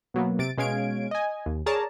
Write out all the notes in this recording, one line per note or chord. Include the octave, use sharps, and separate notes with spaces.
B2 F#3 A#3 B3
C3 A6 D7
B2 G#3 C#4 F5 G#6 D7
D#5 G#5
D#2
G#4 A#4 C#5 D5 A5 A#5